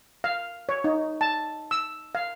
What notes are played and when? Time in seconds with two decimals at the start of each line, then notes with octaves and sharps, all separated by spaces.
0.24 F5
0.69 C#5
0.84 D#4
1.21 A5
1.71 E6
2.15 F5